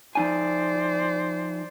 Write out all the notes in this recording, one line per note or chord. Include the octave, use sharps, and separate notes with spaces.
F3 D#4 C5 D5 G#5